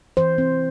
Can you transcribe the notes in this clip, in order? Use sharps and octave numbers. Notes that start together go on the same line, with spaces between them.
E3 C5
C4